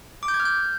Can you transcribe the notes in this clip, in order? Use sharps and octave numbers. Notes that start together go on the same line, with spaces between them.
D6
G6
G#6
F6
G6